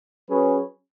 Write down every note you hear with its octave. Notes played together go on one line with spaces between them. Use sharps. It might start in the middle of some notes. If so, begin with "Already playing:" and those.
F#3 C#4 G#4 B4